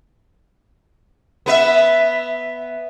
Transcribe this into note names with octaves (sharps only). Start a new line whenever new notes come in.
B3 B4 E5